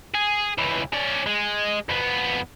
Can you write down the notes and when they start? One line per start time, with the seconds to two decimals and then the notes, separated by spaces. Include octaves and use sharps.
0.14 G#4
0.58 C#2 E3
0.93 C#4 D5
1.26 G#3
1.89 F2 B3